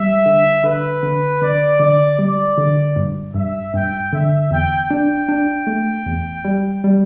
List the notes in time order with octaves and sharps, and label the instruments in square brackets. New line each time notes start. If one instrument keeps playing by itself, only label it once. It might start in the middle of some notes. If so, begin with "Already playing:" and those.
Already playing: [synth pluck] G3 [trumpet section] E5
[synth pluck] D3
[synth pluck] D3 [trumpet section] B4
[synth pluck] D3
[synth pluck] D3 [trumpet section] D5
[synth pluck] D3 [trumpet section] D5
[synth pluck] G3 [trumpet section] D5
[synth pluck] D3
G2
[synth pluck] G2 [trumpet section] E5
[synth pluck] G2 [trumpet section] G5
[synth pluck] D3 [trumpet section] E5
[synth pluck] E2 [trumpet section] G5
[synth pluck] D4 [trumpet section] G5
[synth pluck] D4
A3
E2
G3
G3